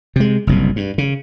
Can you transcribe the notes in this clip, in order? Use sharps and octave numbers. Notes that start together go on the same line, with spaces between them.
C3 G#3
F#1 C2 B2
G2
C#3